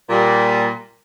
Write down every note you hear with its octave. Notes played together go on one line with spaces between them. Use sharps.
A#2 G3